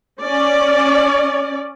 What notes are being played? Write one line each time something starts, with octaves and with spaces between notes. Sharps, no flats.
C#4 D5